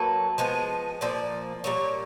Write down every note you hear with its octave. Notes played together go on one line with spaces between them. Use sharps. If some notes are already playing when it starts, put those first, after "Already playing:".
Already playing: F#3 A#3 A4 B4
F3 G#3 B3
A#2 F3 A#3 D5
A#2 G3 A#3 C#5